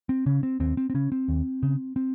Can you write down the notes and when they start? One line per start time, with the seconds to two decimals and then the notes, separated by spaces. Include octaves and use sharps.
0.09 C4
0.26 C#3 C#4
0.43 C4
0.60 D#2 C4
0.77 C4
0.90 C4
0.94 C#3 C#4
1.12 C4
1.28 D#2
1.63 C#3
1.96 C4